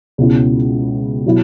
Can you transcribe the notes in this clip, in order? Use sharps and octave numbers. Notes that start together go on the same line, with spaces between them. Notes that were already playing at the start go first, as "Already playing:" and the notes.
C#2 B2 G#3 C#4 E4
B2 F#3 E4